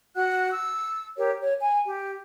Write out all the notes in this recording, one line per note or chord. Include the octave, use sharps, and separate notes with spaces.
F#4 F#5 F#6
E6
G4 A#4 C#5
C#5
G#5
G4